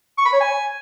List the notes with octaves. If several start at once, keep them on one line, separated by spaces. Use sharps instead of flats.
C#6
B5
C#5
G#5